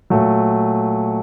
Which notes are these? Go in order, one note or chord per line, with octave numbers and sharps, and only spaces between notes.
A#2 F#3 A3